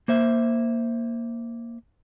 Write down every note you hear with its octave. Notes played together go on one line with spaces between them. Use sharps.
A#3 C5 E5